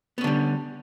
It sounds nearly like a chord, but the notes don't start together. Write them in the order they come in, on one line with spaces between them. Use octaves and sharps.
B3 C#4 D3 G3